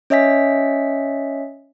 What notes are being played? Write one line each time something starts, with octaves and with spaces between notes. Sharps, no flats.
C#4 C#5 D#5 E5 G#5 B6